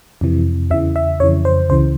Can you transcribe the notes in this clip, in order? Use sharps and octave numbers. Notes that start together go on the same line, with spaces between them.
F2 C3 E3
E2 C#3 E3 E5
E5
F2 C#3 E3 C#5
C5
C#2 C#3 E3 C5